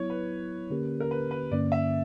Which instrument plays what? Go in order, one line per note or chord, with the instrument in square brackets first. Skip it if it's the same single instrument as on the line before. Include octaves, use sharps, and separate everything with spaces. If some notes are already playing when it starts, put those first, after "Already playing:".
Already playing: [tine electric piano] F#3 B3 E4 [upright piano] C#5
[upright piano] B4
[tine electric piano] D3 A#3 C#4 G4 A#4
[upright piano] A#4
B4
B4
[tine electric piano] G2 D3 A#3 C#4 [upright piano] D5
[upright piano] E5